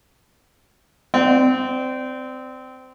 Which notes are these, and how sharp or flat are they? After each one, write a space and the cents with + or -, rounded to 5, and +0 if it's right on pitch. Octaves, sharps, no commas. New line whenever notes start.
C4 -20 D5 +5